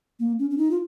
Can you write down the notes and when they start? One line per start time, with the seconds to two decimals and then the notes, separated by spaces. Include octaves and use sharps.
0.19 A#3
0.39 C#4
0.50 C#4
0.58 D#4
0.71 F4